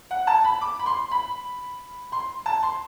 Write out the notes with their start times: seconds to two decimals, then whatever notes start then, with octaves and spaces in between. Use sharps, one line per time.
0.11 F#5
0.27 A5
0.45 B5
0.61 D6
0.79 B5
0.86 C6
1.11 B5
2.12 C6
2.46 A5
2.63 C6